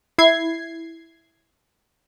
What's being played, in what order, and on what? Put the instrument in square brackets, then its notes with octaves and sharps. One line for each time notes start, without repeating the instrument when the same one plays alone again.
[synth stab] E4 G#6 C7